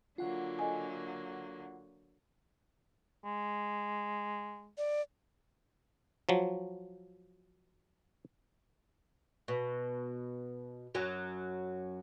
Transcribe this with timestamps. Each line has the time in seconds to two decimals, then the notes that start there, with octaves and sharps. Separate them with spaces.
0.18 D3 F#3 A#3 F4 F#5
0.59 A4 D#5 G#5
3.25 G#3
4.78 D5
6.29 F3 F#3
9.48 B2
10.95 F#2 F#3